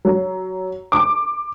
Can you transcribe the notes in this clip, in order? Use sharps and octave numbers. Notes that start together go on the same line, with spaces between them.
F#3
D6